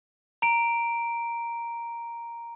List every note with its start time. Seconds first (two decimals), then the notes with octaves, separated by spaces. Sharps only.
0.42 A#5 D7